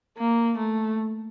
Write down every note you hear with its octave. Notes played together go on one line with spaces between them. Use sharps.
A#3
A3